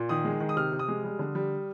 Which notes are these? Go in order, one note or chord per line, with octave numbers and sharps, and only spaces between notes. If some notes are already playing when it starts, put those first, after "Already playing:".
Already playing: A#2
D#3 D#6
G#3
D#3
D#6
C3 F6
C3
D#6
G#3
G3
D3
G3